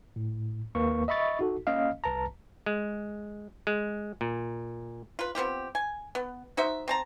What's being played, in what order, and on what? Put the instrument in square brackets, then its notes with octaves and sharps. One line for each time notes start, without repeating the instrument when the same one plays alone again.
[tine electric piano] A2
D#2 A#3 B4 C#6
D#5 E5 B5 C#6 A6
D#4 F#4 A4
A#3 C#4 D#5 F5
C2 B4 A5 A#5
[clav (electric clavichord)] G#3
G#3
A#2
[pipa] F4 B4
B3 C4 F4 G4
G#5
B3
D#4 F#4 C5 E5
C4 A5 A#5